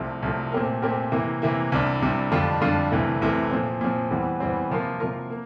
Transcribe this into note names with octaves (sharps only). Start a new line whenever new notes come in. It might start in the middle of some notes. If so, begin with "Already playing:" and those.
Already playing: C2 C3 F3 A3
C2 C3 F3 A3
A#2 A3 C4 G4 A#4
A#2 A3 C4 G4 A#4
C3 E3 A#3
C3 E3 A#3
C2 C3 G3 D4
C2 C3 G3 D4
F2 D3 G3 D4 F4
F2 D3 G3 D4 F4
C2 C3 E3 A3
C2 C3 E3 A3
A#2 F3 C4
A#2 F3 C4
E2 E3 G3 C4
E2 E3 G3 C4
C3 F3 A#3 F4 A#4
C3 F3 A#3 F4 A#4
A#3